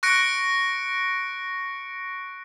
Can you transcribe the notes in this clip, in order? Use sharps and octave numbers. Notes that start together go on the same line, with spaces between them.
C#6 F#6 A#6 C#7 D7